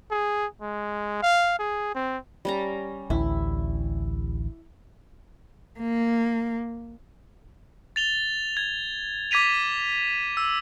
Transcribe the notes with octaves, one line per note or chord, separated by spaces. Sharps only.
G#4
G#3
F5
G#4
C4
G3 C#4 A#5
A1 D2 E4
A#3
A6 F7 G7
G#6
D6 G#6 B6 D#7 F7
E6